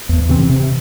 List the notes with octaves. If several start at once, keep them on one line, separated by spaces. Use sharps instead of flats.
E2
C3 E3 C4
C3